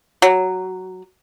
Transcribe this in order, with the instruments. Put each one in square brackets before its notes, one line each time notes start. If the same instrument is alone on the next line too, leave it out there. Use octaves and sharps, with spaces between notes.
[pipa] F#3